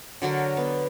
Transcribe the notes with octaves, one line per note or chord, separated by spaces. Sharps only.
D3 F#3 F#4 A#4
B3